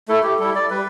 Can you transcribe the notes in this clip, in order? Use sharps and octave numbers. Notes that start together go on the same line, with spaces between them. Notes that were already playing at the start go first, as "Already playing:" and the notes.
A3 E4 A4
G4
G3 E4 A4
D5
G3 B4